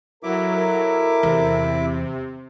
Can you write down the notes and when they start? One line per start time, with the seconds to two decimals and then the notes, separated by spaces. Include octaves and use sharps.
0.23 B2 F#3 E4 A4 A#4 E5 D6
1.23 E2 C3